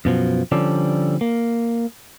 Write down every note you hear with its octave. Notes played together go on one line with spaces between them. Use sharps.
F#2 B2 F3
D3 F3 G3 C#4 A4 D5
A#3